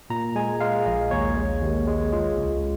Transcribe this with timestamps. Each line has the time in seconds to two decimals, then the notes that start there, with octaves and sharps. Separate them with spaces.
0.10 A#2 A#5
0.36 G#3 G#5
0.61 G#3 F5
0.86 A#1 D#5
1.11 D#2 C#5
1.37 G#3
1.62 D#2
1.87 G#3
2.12 G#3 F4
2.38 C#2